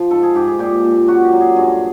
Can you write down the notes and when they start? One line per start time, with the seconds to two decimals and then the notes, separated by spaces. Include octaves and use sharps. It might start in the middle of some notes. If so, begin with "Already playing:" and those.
Already playing: F3
0.11 G#2 A4
0.23 G#4
0.35 G#2 G4
0.48 G#4
0.59 A#2 G4
0.84 A#2
1.08 F#2 F#4
1.24 G4
1.32 F#3
1.41 G#4
1.56 G2 G#4